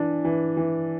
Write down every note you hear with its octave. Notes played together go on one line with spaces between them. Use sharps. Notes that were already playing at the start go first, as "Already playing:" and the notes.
Already playing: E3 D4
E3
E3